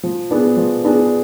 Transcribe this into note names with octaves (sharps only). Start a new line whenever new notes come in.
F3
B3 D4 G#4
F3
B3 D4 G#4